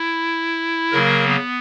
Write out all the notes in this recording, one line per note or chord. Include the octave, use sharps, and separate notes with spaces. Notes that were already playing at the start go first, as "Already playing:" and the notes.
Already playing: E4
C#3 F#3 A#3 A#4
B3